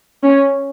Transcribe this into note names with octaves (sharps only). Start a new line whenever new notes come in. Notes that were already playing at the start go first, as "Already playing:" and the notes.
C#4